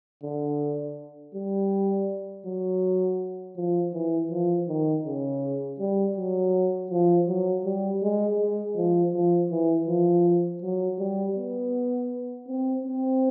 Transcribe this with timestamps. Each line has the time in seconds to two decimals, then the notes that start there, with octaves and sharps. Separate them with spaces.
0.23 D3
1.35 G3
2.46 F#3
3.57 F3
3.93 E3
4.31 F3
4.68 D#3
5.05 C#3
5.80 G3
6.17 F#3
6.91 F3
7.28 F#3
7.65 G3
8.02 G#3
8.40 G#3
8.76 F3
9.13 F3
9.51 E3
9.88 F3
10.62 F#3
10.99 G3
11.36 B3
12.47 C4
12.84 C4